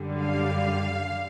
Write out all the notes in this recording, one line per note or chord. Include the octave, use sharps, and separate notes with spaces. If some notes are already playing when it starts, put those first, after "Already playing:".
Already playing: F#2 D3 G3
F5